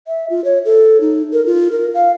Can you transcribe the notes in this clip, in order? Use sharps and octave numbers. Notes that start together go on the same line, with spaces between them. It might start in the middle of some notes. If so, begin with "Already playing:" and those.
E5
F4
C#5
A4
D#4
A#4
F4
A#4
F5